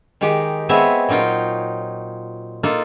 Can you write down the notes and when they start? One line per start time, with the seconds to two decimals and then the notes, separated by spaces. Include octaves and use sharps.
0.21 D#3 G#3 D#4 G4
0.69 G#3 B3 C4 C#5 E5
1.09 A#2 F#3 D#4 F4 G5
2.63 A#3 D#4 F4 A4